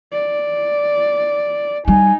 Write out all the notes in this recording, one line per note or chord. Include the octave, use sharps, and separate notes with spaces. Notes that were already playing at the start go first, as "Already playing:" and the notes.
D5
G3 D#4 G#5